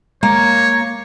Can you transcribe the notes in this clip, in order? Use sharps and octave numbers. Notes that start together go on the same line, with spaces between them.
G#3 A#3 C#5